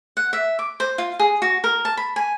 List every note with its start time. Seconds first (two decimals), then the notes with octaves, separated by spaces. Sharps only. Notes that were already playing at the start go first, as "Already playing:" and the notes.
0.17 F#5
0.33 E5
0.59 D6
0.80 C5
0.98 F4
1.19 G#4
1.42 F#4
1.64 A#4
1.85 A5
1.97 B5
2.16 G#5